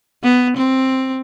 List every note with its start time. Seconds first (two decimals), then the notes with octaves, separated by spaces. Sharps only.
0.23 B3
0.57 C4